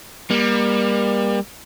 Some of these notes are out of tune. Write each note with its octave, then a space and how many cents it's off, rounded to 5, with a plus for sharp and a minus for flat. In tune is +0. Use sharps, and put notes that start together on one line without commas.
G3 +30 A#3 +30